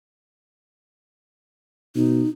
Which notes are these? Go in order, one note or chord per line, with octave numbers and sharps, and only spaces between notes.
B2 D#4